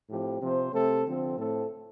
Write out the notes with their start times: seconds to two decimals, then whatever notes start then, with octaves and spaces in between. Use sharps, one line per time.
0.09 A2 F3 C4 G4
0.41 C3 F3 C4 C5
0.73 C3 A3 C4 A4
1.05 D3 F3 C4
1.37 A2 A3 C4 A4